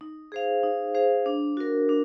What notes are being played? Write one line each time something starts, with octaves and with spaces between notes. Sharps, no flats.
D#4
G#4 C5 F5
D#4
G#4 C5 F5
D4
F#4 A#4
D4